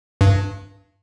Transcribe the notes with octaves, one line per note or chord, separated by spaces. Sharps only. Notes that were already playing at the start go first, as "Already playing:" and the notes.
G2